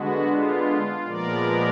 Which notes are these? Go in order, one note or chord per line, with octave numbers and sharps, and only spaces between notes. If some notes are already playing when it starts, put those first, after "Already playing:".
Already playing: D3 G#3 B3 F#4
F4
A#2 F3 G#3 B3 A#4 D5